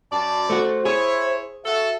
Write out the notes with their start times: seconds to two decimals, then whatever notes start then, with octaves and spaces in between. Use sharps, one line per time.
0.12 F#2 D5 A5
0.50 A3 F#4 C5
0.85 E4 G#4 C#5
1.66 F#4 A4 E5